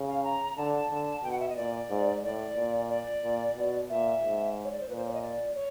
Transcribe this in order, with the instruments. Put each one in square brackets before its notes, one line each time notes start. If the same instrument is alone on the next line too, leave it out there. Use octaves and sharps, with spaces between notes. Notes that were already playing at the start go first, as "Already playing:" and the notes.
Already playing: [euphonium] C#3
[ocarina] F5
A#5
[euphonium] D3 [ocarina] A5
[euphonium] D3
[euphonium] B2 [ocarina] G5
[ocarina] F#5
E5
D#5
[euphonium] A#2 [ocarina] D5
[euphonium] G#2
[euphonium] A2 [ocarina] D5
[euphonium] A#2
[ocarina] D5
[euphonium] A#2
B2
[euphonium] A#2 [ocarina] E5
[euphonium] G#2
[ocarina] C#5
D5
C5
[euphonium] A#2 [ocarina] B4
[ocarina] C5
C#5
D#5
D5
C#5